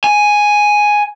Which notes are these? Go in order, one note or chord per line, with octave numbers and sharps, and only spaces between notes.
G#5